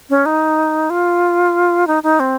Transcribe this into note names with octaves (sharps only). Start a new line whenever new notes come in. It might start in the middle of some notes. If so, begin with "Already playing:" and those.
C#4
D#4
F4
D#4
D#4
C4